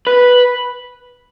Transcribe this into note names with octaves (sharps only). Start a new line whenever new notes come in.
B4